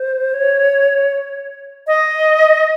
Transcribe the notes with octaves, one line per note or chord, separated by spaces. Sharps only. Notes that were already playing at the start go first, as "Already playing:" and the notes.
Already playing: C5
C#5
D#5